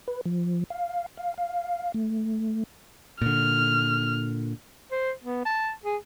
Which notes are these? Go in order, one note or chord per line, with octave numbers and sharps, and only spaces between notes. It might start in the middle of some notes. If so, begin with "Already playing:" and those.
B4
F3
F5
F5
F5
A3
A#2 D3 F6
C5
B3
A5
G#4